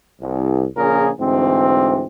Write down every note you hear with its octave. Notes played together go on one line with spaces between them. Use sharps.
C2
A#1 A#2 C#3 G#4 A#4
D2 G#2 E3 C4